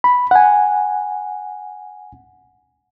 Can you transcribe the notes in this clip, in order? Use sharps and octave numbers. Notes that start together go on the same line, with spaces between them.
B5
F#5 G#5